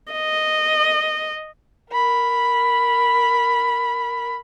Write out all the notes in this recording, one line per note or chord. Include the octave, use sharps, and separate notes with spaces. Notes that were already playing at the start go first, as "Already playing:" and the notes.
D#5
A#4 B5